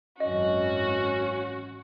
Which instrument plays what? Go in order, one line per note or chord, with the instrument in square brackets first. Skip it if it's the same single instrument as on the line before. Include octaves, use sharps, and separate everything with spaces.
[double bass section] G#1 F#2 E3 [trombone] C#4 [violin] F#4 [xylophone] D#5